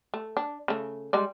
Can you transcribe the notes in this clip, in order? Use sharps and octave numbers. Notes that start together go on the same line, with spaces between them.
A3
D4
C#3 A3
G3 G#3 D5